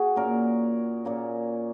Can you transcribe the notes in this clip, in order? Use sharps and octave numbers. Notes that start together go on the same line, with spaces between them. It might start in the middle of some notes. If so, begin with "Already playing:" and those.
Already playing: F#4 G#4
A#2 A#3 C#4 A#4
A#2 A#3 C#4